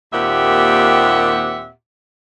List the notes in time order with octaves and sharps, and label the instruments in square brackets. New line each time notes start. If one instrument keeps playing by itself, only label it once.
[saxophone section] D#2 A#2 C4 G4 E5 F#5